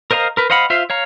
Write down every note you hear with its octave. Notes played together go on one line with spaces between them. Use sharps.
A#4 C5 D#5 F5 A#5
A#4 B4
C5 D#5 F5 F#5 B5
F4 C5 E5 F5
C#5 F5 A#5